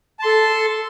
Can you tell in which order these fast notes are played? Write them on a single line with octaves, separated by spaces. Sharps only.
A5 C6 A4